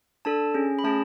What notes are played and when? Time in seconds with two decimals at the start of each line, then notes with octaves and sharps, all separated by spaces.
0.25 D4 A4 A5
0.54 C#4 G#4
0.79 B5
0.84 A3 C#4 G#4 A5